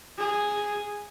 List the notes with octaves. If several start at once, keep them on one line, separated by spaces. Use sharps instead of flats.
G#4